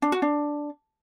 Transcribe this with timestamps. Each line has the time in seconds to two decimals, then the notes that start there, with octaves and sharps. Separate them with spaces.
0.02 D4
0.12 F#4
0.22 D4